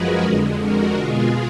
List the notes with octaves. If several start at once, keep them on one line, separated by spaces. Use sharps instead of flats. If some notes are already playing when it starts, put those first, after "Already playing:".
Already playing: F#2 F3 G#3 F#4 G#4 A#4 B4
F2 D3 G#3
F#4 A#4
B2 G#3 F4 G#4